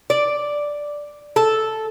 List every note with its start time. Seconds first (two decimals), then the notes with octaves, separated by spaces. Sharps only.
0.10 D5
1.36 A4